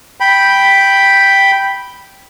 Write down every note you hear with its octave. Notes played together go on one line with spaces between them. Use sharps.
G5 B5